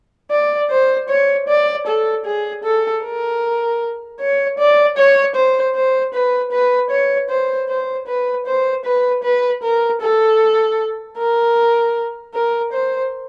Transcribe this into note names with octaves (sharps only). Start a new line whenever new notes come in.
D5
C5
C#5
D5
A4
G#4
A4
A#4
C#5
D5
C#5
C5
C5
B4
B4
C#5
C5
C5
B4
C5
B4
B4
A#4
A4
A#4
A#4
C5